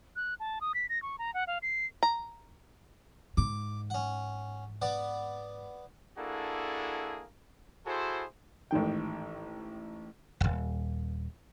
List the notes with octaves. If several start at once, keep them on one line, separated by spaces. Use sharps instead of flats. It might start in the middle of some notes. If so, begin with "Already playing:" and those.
F#6
A5
D#6
B6
A#6
C#6
A#5
F#5
F5
C7
A#5
G#2 D6
C#4 F#5
B3 D5 F#5
A#3 D4 E4 F#4 G#4 A4
E4 F#4 G#4 A4 C5
A1 G#2 D#3 G5
D#1 G#1